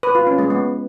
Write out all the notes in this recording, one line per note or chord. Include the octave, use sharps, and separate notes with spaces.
B4
F4
C#4
G#3
B3